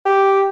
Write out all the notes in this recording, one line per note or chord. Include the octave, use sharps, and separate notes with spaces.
G4